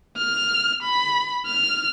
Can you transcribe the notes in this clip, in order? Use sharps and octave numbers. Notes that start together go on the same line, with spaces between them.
F6
B5
F6